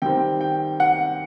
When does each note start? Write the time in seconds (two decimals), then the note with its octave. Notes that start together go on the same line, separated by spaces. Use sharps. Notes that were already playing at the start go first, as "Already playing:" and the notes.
0.02 D#3 G3 C4 G5
0.41 G5
0.80 F#5